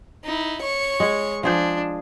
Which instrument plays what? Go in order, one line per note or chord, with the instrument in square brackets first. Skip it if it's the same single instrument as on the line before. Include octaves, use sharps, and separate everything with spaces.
[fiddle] D#4 E4
C#5 C#6
[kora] G#3 G#4
[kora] F3 G#4 C5 [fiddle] D4